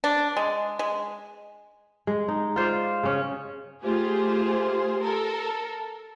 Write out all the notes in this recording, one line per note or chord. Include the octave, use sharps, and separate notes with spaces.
D4
G#3
G#3
G#3
D#4
F4 C5 D5 F5
C#3 C#4
A3 F4 G4 G#4 C5
A4 A#4